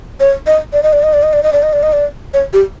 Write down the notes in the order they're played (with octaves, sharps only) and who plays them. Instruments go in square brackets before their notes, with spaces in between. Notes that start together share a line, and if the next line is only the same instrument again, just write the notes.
[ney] C#5
D#5
D5
D#5
D5
D#5
D5
D#5
D5
D#5
D5
D#5
D5
D#5
D5
C#5
G4